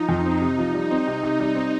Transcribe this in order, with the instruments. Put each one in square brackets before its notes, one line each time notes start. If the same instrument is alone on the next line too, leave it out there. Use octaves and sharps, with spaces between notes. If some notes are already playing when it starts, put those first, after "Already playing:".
Already playing: [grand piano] F3 [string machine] D#4
[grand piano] F2
C4
C3
F3
[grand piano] G3 [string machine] D#4
[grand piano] C4
C3
C3
G3
C4